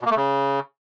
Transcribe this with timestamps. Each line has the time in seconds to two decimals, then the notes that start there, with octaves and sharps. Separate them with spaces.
0.01 B2
0.06 A#3
0.11 A3
0.16 C#3